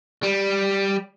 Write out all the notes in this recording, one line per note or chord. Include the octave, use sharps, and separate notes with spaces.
G3